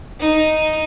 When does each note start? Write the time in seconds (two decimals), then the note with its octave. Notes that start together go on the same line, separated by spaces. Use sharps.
0.20 D#4